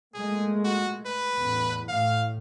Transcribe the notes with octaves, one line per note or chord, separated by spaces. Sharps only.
A#2 G#3 A3 G#4
F#4
B4
A1 E2
A2 F5